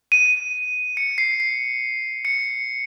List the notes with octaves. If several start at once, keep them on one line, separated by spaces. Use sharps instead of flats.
D#7
C#7
C7
C7
C#7